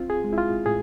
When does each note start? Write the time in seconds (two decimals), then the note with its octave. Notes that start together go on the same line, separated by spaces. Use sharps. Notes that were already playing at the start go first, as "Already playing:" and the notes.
Already playing: C4 F4
0.10 G#4
0.24 G#3
0.33 E4
0.38 F4
0.66 A2 G#4